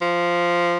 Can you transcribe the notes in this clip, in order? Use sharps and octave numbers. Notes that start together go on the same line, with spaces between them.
F3